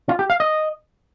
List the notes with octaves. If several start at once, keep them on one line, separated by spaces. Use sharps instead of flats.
F4
G4
F5
D#5